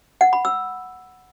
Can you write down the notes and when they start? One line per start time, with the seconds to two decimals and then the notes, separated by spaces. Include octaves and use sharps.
0.21 F#5
0.33 B5
0.45 E6